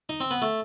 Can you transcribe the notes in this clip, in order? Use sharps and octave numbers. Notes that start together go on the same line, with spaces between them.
D#4
C4
B3
A3